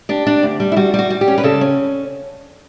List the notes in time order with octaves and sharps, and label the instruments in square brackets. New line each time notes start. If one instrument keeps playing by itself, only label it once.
[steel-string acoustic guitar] D4 G4
D4
D2
G3
E4
G3 F#4
G3
F#4
G3
G4
C#4
B4
C#3 A4
C#4